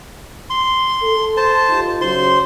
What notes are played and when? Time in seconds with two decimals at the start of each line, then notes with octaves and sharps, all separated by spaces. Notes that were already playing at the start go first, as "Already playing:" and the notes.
0.50 C6
1.02 A4
1.37 C5 A5
1.69 D#4 F4 G4
2.01 C#3 F#3 C5 C6